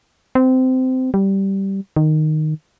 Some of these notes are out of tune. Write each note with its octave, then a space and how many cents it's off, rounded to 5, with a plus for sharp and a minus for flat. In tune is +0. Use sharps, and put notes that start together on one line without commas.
C4 -20
G3 -10
D#3 -10